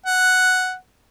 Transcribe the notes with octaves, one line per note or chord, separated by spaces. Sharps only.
F#5